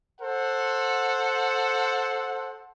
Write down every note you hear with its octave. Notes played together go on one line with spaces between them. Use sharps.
A4 C5 F#5